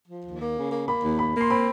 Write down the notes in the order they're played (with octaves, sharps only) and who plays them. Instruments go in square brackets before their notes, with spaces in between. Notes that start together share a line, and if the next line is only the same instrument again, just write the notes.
[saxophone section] F3
D#2
A#3
C#3
A#3
[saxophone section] A#3 [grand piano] B5
[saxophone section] D#2
[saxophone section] A#3 [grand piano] B5
[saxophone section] A#3
[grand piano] C6
[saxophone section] C4 [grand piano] B5